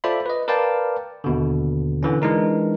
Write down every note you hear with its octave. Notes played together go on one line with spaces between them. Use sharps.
F4 A4 C5 D5 E5 B5
B4 D#5
A#4 B4 D5 F5 G5 A5
D#2 B2 D3
D3 E3 C#4
E3 G#3 D4 D#4 A#4